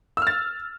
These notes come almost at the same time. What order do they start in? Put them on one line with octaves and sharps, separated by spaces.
E6 F6 A6